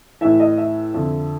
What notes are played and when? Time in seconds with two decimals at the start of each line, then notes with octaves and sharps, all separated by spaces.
0.21 A2 E3 E5
0.40 D#5
0.57 E5
0.94 F2 D3